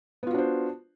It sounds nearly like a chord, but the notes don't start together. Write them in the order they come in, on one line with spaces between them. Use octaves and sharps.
B3 F4 F#4 D4 C5